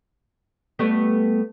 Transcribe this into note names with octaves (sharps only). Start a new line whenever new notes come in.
G3 A3 B3